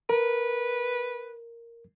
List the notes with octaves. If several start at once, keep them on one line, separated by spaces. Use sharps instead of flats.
A#4 B4